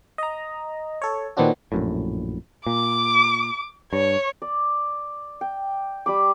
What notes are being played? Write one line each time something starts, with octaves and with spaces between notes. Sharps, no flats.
D#5 A#5
A4 C#5
A#2 D#3 B3 C4 D4 F#4
A#1 F#2 A2
A#2 D6
G2 C#5
D5
G5
G3 B5 D6